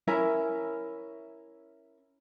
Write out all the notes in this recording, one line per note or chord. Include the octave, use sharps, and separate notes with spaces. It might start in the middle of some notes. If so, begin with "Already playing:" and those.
C#4 E4 A#4 E5